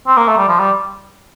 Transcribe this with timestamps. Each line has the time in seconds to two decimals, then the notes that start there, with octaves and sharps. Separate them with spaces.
0.07 C4
0.17 A#3
0.28 A3
0.37 G3
0.48 F3
0.60 G3